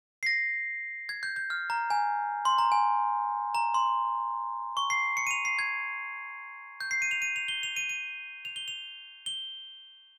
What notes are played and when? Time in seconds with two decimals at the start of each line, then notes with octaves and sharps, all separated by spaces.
0.23 C7
0.26 A#6
1.09 G#6
1.23 G6
1.36 G6
1.50 F6
1.70 A#5
1.90 G#5
2.45 C6
2.58 A#5
2.72 G#5
3.55 A#5
3.74 C6
4.77 C#6
4.90 C7
5.17 C#7
5.27 D#7
5.31 F7
5.45 C7
5.59 G#6
6.81 G6
6.91 C7
7.02 D#7
7.11 F7
7.22 D#7
7.36 F7
7.48 G7
7.63 F7
7.76 D#7
7.89 D#7
8.45 F7
8.56 G7
8.68 F7
9.26 G7